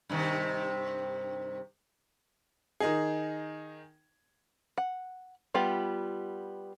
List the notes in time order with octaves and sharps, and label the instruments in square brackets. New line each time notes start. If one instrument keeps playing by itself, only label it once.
[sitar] G2 C3 D#3
[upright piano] D#3 D#4 G#4
[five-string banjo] F#5
G3 B3 F4 G4